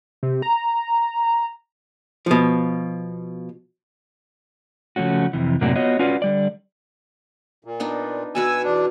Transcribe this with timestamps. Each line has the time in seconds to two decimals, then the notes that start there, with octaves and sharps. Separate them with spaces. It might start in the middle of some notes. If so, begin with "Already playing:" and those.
0.23 C3
0.42 A#5
2.26 B2 F3
4.96 C#3 F3 A3 C#4 F#4
5.33 F2 C3 E3
5.61 F#2 A2 C3 A#3 D4 F#4
5.76 B3 F4 F#4 C#5 D#5
5.99 C#4 F4 F#4 B4 D5
6.22 D3 G3 D5
7.65 A#2
7.80 B3 D4 D#4
8.35 B2 F#4 B4 G#5 E6
8.64 E2 D4